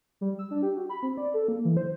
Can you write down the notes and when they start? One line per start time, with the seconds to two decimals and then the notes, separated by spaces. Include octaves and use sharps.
0.21 G3
0.39 E6
0.51 D4
0.63 G4
0.77 F#4
0.90 B5
1.03 C4
1.17 D5
1.34 A4
1.48 A#3
1.65 E3
1.77 C5